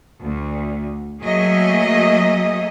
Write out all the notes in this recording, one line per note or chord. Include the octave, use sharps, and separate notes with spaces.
D2
F#3 A3 A#3 G#4 D#5 E5